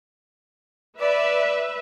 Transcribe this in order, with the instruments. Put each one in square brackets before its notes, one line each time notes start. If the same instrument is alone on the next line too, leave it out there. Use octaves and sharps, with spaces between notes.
[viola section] B4 E5 [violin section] D5